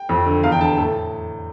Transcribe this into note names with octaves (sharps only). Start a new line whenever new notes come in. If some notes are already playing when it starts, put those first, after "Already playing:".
Already playing: G5
F2
D3
E2 F5
G5
D3 A5
A2 A4